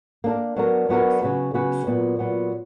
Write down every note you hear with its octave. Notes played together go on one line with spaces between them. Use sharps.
A#3 D4 A#4
F#3 B3 D4 F#4 A#4
F#3 B3 D4 F#4 A#4
C#3 F#3 B3 F#4 B4
C#3 F#3 B3 F#4 B4
A#2 F#3 B3
A#2 F#3 B3